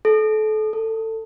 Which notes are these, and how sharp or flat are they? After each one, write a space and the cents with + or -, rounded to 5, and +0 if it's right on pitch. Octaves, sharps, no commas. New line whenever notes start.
A4 -30
A4 +20